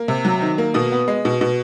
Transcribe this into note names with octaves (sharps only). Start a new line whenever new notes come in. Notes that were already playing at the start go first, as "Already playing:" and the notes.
Already playing: A#3
C3
F#3
D#3
A#3
B2 D#6
B3
G#3
B2
B2